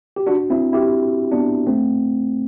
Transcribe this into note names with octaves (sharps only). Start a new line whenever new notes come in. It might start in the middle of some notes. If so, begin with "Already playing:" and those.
G4
D4 F#4
C4 E4
E4 G4
B3 D4
A3 C4